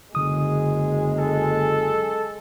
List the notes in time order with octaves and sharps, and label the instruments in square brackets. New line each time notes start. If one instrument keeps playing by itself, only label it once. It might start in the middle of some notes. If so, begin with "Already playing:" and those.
[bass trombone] F#1 [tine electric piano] D3 D#6 [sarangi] G#3
[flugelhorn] A4